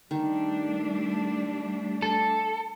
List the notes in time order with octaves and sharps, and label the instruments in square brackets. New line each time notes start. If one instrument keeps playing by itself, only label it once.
[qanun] D#3 [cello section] G3 A3 D4
[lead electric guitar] A4